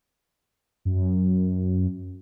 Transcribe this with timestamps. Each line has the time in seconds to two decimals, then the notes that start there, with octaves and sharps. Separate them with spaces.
0.85 F#2